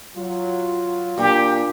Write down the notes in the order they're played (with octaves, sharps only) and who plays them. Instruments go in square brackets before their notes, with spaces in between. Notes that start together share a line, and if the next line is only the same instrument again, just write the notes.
[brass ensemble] F#3 [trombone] F4
[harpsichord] A#2 [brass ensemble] D4 [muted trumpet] G4